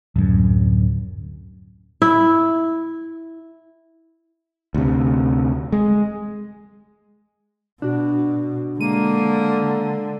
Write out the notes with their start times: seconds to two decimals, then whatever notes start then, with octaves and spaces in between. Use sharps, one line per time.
0.16 D1 F#2
2.02 E4
4.74 D2 C3
5.72 G#3
7.82 B2 D4 F#4
8.80 D3 G#3 A#3 D#7